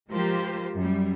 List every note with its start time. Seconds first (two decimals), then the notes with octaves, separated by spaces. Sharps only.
0.11 F3 G#3 F4 G4 A#4 C5
0.76 F#2 G3